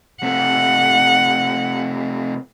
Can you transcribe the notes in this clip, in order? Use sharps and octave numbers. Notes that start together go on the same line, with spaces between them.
C3 A3 F#5